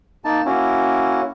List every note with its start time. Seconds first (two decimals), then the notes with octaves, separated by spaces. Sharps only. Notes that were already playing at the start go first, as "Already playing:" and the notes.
0.25 A#3 D#4 A5
0.45 A#3 C#4 E4 F#4